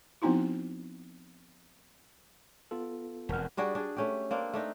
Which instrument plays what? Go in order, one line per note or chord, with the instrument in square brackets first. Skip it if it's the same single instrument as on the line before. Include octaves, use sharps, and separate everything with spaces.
[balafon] F3 B3 C4 D#4 E4 F#4
[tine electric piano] B3 F4 A4
[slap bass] E1 F2 [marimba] A#4 F#5 F6
[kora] G3 D4 F#4 G#4
D4 G#4
A3 C#4 G4
A#3 C4 D4
A3 D4 D#4